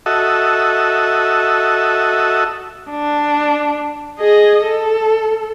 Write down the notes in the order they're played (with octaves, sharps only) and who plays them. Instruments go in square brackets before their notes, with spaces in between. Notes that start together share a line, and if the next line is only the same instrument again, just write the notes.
[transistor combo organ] F#4 A4 D#5 E5
[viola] D4
G#4 D#5
A4